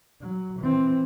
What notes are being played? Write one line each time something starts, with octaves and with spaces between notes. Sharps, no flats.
F#3
E3 C4